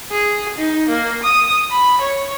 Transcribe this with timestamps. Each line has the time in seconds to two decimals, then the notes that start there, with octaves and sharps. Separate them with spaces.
0.11 G#4
0.58 D#4
0.89 A#3
1.23 D#6
1.71 B5
2.01 C#5